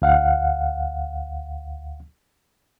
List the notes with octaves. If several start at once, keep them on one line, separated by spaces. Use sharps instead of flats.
D2 F5 F#5